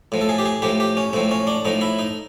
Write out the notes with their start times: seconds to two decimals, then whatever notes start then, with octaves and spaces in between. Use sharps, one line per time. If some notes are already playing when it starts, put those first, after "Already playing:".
0.12 A2 F3
0.21 A4
0.29 G#4
0.38 G4
0.46 G#4
0.62 A2 F3 G4
0.80 G4
0.97 C#4
1.13 A2 F3 C4
1.31 C#4
1.47 D4
1.65 A2 F3 D#4
1.81 E4
1.99 D#4